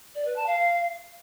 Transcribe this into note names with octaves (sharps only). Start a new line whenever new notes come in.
D5
B4
A5
F5